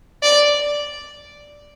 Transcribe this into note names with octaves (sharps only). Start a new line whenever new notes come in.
D5